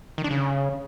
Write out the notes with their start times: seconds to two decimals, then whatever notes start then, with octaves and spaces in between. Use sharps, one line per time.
0.18 D#3
0.24 D4
0.31 C#3